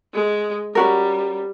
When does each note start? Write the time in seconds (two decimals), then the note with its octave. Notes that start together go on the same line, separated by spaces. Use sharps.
0.14 G#3
0.75 G3 C#4 F#4 A#4